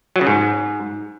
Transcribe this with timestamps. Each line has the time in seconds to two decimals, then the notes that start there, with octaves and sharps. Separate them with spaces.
0.16 F#3
0.21 C#3
0.27 G#2